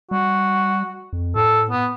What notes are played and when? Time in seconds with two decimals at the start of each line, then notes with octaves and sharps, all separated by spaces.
0.11 G3 F#4
1.13 F2
1.35 A2 A4
1.70 B3